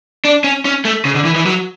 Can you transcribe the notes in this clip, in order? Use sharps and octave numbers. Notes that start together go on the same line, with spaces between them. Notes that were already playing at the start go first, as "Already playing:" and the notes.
D4
C#4
C#4
A3
C#3
D3
E3
E3
F#3